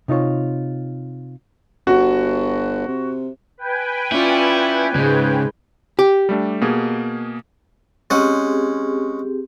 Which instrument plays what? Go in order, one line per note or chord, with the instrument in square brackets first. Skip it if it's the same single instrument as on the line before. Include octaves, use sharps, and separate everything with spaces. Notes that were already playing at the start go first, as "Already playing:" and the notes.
[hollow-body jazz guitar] C3 D#4 F4 C#5
[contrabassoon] G1 [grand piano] F#4
[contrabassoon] C3
[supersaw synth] B4 G5 G#5
[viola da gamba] C#4 F4 D5 [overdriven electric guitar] E4
[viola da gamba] G#2 G#3 [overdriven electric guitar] C#3
[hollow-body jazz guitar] G4
[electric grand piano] G3 A3 D4
B2 A#3 G#4
[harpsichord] G#3 C#4 F#5 [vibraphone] C4 G4 G#4